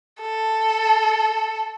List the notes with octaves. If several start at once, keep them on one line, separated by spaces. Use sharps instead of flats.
A4